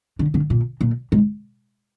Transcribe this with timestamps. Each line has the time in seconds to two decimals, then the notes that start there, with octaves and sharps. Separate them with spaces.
0.19 D3
0.34 D3
0.50 A#2
0.81 A#2
1.12 G#2